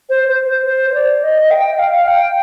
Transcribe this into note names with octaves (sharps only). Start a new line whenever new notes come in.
C5
C5
C5
C5
C5
D5
D#5
G5
F5
G5